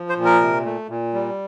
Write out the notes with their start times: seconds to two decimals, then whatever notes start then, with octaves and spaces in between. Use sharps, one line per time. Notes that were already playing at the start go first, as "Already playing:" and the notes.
Already playing: F3
0.09 C5
0.17 A#2
0.25 A#4
0.41 C3
0.65 A3
0.89 A#2
1.13 G3